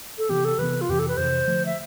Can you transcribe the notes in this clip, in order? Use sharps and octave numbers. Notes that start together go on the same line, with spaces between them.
A4
C3 E3 B3 G4
A4
C3 E3 B3 B4
F4
F2 C3 E3 G4
A4
B4
F2 C3 E3 C5
D3 F3 A3
E5